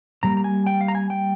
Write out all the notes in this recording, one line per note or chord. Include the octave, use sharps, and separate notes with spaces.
G#2 G3 A#3 A#5
A#5
G#5
G5
F5
A#5
G#5
G5